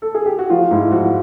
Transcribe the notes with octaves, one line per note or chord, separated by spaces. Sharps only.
A4
G#4
G4
F#4
F3 F4
G#2 E4
F3 F#4